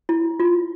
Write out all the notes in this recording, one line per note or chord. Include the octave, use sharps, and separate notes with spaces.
E4
F4